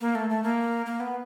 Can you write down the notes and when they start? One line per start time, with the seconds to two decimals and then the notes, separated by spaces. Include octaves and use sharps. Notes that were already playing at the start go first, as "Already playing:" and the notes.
0.01 A#3
0.15 A3
0.30 A3
0.43 A#3
0.86 A#3
1.00 B3